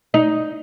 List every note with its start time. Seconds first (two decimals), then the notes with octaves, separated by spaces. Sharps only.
0.14 D#4